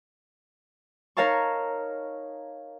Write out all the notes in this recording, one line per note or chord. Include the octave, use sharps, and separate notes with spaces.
D#4 A#4 C#5 F5 A5 C#6